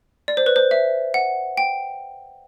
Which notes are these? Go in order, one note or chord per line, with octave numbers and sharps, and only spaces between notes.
D5
C5
B4
C5
E5
F#5
G5